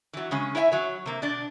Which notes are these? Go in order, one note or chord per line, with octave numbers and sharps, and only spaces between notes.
E3 F#3
C#3 G#3 C#4
E4 C#5 E5 G5 G#5
F#3 C#5
C3 A#3
B2 D4 D5